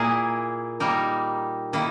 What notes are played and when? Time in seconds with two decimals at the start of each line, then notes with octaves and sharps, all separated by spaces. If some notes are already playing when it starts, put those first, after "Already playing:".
Already playing: A#2 A#3 E4 G#4
0.80 G3 A#3 D#4 A#4
1.73 D#3 A#3 E4